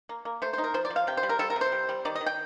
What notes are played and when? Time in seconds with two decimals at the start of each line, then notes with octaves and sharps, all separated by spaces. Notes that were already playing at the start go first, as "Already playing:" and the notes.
0.09 A#3
0.25 A#3
0.42 A3 C5
0.53 C5
0.58 D#4
0.64 A#4
0.74 F3 C5
0.85 D5
0.90 F3
0.96 F5
1.07 C3 G5
1.17 C5
1.23 G3
1.29 A#4
1.39 G3 A4
1.50 A#4
1.56 C3
1.61 C5
1.72 G3
1.89 G3
2.05 D#3 D5
2.15 D#5
2.21 D#3
2.26 G5